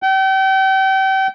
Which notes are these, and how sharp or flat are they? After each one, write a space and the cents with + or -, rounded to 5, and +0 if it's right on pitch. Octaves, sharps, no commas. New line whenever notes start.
G5 -35